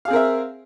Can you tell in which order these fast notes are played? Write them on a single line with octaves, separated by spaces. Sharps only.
F5 G#4 C4 A#4 E5